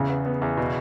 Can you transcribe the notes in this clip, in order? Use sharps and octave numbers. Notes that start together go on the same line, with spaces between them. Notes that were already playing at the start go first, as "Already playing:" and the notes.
Already playing: E2 C#3
B3
B3
E2
B2